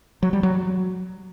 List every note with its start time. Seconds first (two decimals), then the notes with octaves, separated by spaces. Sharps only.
0.23 F#3
0.33 G3
0.43 F#3